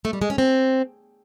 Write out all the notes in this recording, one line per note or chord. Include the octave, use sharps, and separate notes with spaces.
A3
G3
G#3
C#4
C4